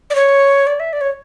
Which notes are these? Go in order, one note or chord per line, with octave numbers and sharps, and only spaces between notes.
D5
C#5
D5
E5
D5
C#5